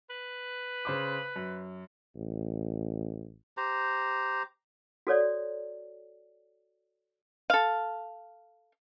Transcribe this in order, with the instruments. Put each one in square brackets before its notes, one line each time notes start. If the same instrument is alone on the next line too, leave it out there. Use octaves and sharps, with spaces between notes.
[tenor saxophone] B4
[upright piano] C#3 C5 D6
F#2
[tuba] A1
[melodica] G4 C5 A#5
[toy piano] F#4 A4 C#5 D5
[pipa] A4 F5